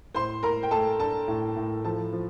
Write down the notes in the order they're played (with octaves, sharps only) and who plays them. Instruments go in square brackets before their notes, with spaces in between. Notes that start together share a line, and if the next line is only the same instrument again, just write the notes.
[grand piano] A2 [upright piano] C5 C6
[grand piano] A2 [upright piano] A#4 A#5
[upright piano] G5
[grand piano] A3 [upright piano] A4 A5
[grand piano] D4 [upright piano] A4 A5
[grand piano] A2
A2
[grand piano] F3 [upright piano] A4 A5
[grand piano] F3